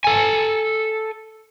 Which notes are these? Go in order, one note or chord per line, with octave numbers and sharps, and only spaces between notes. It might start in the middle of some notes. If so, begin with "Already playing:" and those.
A4 G#5